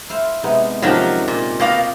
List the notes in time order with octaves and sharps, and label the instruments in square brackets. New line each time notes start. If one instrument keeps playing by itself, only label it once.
[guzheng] E4 C5 F5
[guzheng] C3 [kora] G#3 B3 D#4
[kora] C3 D#3 F5 [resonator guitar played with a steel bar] F3 F#3 [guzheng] C#4 A#4
[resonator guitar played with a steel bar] A#2 [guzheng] D4
[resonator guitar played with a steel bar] B2 A#3 F5 [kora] F4 G5